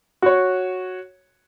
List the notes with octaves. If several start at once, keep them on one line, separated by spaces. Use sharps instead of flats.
F#4 C#5